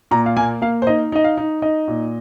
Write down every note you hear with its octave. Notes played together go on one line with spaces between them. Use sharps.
A#2 A#5
F5
A#3 G#5
A#3 F5
C5
D#4 D#5
D#4 D#5
F5
D#4
D#4 D#5
A#2